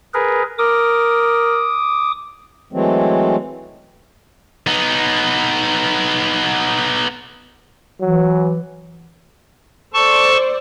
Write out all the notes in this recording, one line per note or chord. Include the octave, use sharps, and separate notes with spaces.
G#4 A#4 B4
A#4 D6 D#6
E3 F#3 G#3 A3 C4
B3 D#4
E3 F#3
A4 C5 D5 A5 C#6